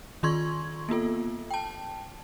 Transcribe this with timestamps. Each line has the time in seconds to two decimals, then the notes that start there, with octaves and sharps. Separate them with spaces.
0.23 D#3 F4 C6 C#6 G#6
0.89 A#3 B3 F4 A4
1.51 G5 A5